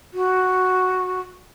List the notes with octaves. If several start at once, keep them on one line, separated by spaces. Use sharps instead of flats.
F#4